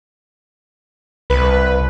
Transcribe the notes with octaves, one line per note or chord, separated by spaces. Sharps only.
C2 B4